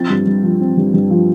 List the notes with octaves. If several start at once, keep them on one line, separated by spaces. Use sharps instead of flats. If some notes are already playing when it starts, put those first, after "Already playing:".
Already playing: F3 C4 A6
G2
G2
F3
C4
G2
G2
F3